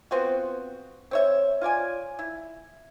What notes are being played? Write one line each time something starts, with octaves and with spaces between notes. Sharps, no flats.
B3 C4 F4 F#4
C4 C#5 E5
F4 C#5 D5 G#5
E4